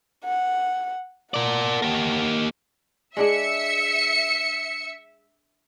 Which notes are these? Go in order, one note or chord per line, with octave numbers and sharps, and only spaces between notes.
F#5
A#4 D5 F#5 A5
A#3 G4
G#3 D4 G#4 E5 C#7